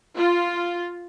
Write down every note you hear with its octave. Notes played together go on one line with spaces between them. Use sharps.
F4